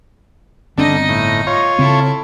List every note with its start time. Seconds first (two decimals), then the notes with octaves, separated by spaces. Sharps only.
0.78 G1 D3 C4 D4 D#4 D#5
1.09 A2
1.47 F4 C#5
1.79 C#3 C4 E4 A4